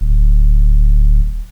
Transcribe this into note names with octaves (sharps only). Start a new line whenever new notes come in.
D1